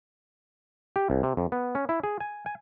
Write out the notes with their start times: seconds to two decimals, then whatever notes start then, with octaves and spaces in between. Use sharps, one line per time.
0.96 G4
1.10 C2
1.23 C3
1.37 F2
1.52 B3
1.75 C#4
1.89 E4
2.04 G#4
2.20 G#5
2.46 G#5